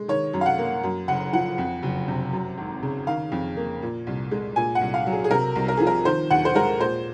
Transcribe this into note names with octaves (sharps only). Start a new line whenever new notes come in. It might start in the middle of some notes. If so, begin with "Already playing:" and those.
Already playing: G#3
D#3 C#5
F#2
F5
F#5
A#3
F#2
F#1 F#5
F3 F#5
F2
F#1
C3
F#2
G#1
C#3
D#3 F5
F2
A#3
A#2
C2
G#3
A#2 G#5
F#5
C2
F5
F#3
G#4
G#4
C3 A#4
C2
A#4
F3 G#4
A#4
D#3 C5
D#2 F#5
C5
G#3 A#4
A#2 C5